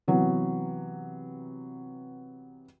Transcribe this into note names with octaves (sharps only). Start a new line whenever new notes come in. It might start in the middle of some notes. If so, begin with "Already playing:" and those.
C3 E3 F#3 B3